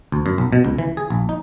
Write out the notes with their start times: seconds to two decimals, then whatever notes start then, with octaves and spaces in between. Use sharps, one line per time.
0.12 D2
0.26 F#2
0.38 B1
0.53 B2
0.65 C#2
0.78 E3
0.97 G#4
1.10 A#1
1.29 D#4